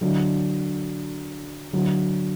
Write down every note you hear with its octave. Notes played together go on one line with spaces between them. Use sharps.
D3 F#3
D3 F#3